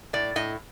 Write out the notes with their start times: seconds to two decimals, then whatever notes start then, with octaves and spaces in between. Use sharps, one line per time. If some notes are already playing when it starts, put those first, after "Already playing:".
0.13 A2 D5
0.36 A2 D#5